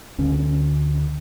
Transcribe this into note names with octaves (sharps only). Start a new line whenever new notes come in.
D2 D3 C#4
C#4